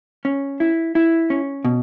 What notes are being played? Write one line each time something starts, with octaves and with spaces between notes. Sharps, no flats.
C#4
E4
E4
C#4
B2